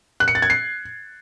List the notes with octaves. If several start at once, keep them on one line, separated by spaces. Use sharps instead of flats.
F#6
C#7
A6
G#6
C7